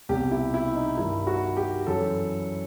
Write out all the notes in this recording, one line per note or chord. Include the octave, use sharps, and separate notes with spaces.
C2 B2 G4
E4
E4
D#4
G2 D#3 E4
F#4
G4
F#2 E3 A4